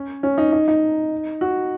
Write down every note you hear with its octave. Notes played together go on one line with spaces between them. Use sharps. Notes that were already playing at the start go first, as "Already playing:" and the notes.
Already playing: C#4
C#4
D#4
D#4
D#4
F#4